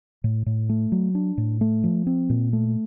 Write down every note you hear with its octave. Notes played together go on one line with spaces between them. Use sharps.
A2
A2
A3
F#3
D4
A2
A3
F3
C4
A#2
A3